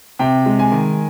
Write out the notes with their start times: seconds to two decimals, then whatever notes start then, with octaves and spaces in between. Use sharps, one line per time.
0.19 C3 G5
0.46 G#3
0.59 G#5
0.72 D#3